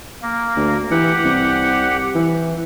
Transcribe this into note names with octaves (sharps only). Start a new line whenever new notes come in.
A#3
D2
E3 G4 F#5
C2
E3